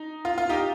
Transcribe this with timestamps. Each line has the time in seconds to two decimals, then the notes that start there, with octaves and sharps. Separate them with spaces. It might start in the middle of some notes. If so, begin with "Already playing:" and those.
Already playing: D#4
0.25 F4
0.38 F4
0.49 D#4 G4